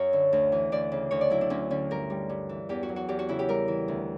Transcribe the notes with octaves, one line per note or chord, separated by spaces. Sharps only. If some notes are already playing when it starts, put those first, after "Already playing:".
Already playing: F#2 F#3 C#5
D3
D2
E3
D2 D5
C#3
D2 C#5
D5
F#3 E4
D4
D2 C#4
D3 C#4
G2 A#4
G3
G2
E3
E2 G4
F#4
F#3
F#4
E2 G4
F#4
C#3 E4
G4
G3 A#4
E3
D2